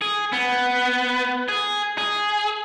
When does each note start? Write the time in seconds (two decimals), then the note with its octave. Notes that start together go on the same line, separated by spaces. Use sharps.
0.01 G#4
0.33 B3
1.49 G#4
1.98 G#4